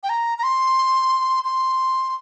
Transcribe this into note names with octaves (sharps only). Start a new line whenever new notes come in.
G5
A#5
A#5
C6
C6